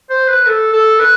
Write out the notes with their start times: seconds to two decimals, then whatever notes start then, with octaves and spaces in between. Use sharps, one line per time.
0.10 C5
0.28 B4
0.47 A4
0.73 A4
0.99 B4